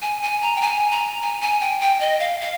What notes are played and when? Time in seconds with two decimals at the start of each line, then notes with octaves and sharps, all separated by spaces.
0.02 G#5
0.22 G#5
0.42 A#5
0.56 G5
0.61 G#5
0.91 A#5
1.22 G#5
1.41 G#5
1.61 G5
1.80 G5
2.00 D#5
2.20 F5
2.40 F5